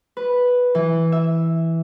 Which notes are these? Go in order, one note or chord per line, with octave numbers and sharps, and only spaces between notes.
B4
E3
E5